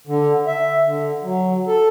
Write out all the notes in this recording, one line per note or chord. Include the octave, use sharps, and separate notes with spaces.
D3
E5
D3
F#3
A4